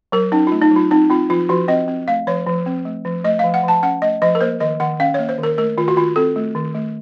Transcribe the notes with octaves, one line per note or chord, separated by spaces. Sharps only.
F#3 A#4
C#4 D#4
A3 F4
D#4
F#3 F4
C4 D#4
C4 F4
F3 F4
F3 F#4
C4 D#5
C4
A3 F5
F3 C#5
F3
C4
A3
F3
A3 D#5
F3 F5
F#5
F3 A5
C#4 F#5
A3 D#5
F3 D#5
A#4
A#3 C5
D#3 D#5
D#3 F#5
C#4 F5
A#3 C#5
C5
D#3
A#4
A3 A#4
D#3 F4
F#4
D#3 F4
C4 A4
A3
D#3
A3